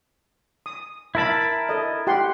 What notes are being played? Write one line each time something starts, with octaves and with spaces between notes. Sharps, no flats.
D#6
E4 A#4 E5 A5 B5
A4 D#5
G4 F#5 C6